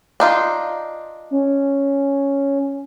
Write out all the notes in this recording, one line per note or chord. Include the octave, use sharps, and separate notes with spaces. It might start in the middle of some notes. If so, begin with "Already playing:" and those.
D4 D#4 F4
C#4